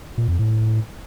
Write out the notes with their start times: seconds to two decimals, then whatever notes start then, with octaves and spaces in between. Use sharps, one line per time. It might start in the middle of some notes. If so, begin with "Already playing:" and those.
0.18 A#2
0.28 F2
0.39 A2